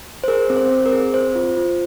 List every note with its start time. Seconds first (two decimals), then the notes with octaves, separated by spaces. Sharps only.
0.24 C5
0.28 G#4 A#4
0.50 C4
0.57 C5
0.71 C4
0.86 A#4
0.92 G#4
1.14 C4 C5
1.35 F4
1.57 F4